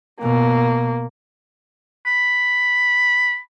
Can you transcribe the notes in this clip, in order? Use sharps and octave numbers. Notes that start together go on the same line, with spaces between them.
B2 A#3
B5